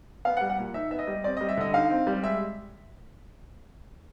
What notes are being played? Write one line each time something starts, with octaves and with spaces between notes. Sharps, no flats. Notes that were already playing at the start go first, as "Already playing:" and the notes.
B3 F5
F#5
G3
F#5
A#2
D#4 E5
B3 E5
D#5
G3
C4 D5
D#5
G3
E5
D3 D#5
D#4 F5
C4
G3
G#3 E5